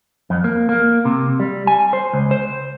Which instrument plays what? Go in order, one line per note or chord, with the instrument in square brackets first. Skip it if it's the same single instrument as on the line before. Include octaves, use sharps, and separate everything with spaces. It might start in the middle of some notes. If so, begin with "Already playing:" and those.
[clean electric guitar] F2
A#3
A#3
C3
G3
G#5
C5
C#2
C5